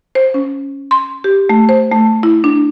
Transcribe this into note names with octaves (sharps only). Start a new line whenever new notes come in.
C5
C#4
C6
G4
A3
C5
A3
E4
D4